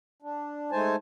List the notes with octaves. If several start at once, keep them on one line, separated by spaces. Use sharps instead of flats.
D4
G#3 A3 D#4 C5 G#5 A5